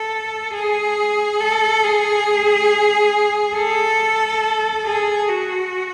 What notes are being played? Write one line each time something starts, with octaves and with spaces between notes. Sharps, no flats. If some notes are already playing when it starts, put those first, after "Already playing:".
Already playing: A4
G#4
A4
G#4
A4
G#4
F#4